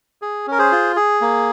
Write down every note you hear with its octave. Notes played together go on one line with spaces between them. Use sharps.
G#4
C#4 A#4
G#4 C5
F4
G#4
A#3